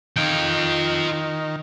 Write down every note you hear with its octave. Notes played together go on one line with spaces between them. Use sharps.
D#3 F4 G5